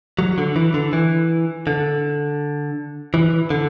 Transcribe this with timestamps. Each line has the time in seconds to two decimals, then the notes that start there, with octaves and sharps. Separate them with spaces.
0.19 F#3
0.38 D3
0.56 E3
0.74 D3
0.93 E3
1.67 D3
3.14 E3
3.50 D3